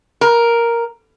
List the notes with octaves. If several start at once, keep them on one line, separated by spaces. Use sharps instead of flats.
A#4